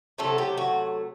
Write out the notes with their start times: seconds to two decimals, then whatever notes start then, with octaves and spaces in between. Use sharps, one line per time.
0.18 C3 F#3 A3 A4
0.38 G4
0.58 F#4